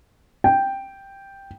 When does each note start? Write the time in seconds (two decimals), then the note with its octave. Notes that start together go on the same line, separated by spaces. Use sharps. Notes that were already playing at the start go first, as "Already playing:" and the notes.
0.44 G5